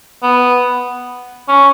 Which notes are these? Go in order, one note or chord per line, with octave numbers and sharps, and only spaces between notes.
B3
C#4